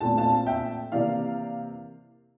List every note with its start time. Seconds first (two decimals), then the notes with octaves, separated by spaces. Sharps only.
0.01 A#2 A3 C4 A5
0.18 F5 A5
0.46 E5 G5
0.92 C3 E3 A#3 D5 F5